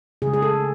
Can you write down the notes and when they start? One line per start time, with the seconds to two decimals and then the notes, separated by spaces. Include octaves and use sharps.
0.22 C#3 G#3 G#4
0.33 G#4
0.42 A4